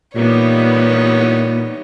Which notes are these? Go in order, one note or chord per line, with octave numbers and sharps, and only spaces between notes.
A#2 E3 G3 B3 D#4 C#5